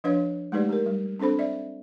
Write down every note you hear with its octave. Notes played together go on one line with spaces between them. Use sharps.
F3 D4 B4 C#5 F5
G#3 A3 D#4 G4 B4 D5
G4 A#4
G3
C4 D4 A4 C5 B5
D5 E5